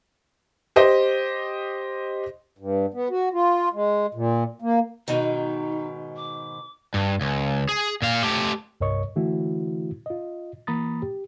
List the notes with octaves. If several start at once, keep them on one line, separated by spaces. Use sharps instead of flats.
G4 C5 D#5
G2
B3
F#4
F4
G#3
A#2
A#3
G#2 B2 D#3 D#4
D6
G2
C#2
G#4
A#2 F5
A3 G4
C2 G2 A#4 C#5 D#5 C#6
D3 E3 A3 E4 F#4
F4 D#5
E3 A#3 A#5 B5 D#6 A6
G4